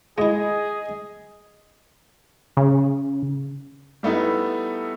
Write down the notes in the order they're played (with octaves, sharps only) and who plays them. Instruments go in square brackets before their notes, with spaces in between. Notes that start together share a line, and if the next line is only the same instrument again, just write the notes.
[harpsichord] G#3 E4 [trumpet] G#4 [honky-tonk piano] D#5
[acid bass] C#3
[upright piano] G3 A3 B3 D#4 E4